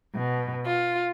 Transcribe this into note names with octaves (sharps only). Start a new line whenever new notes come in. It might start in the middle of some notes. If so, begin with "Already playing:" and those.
B2
F4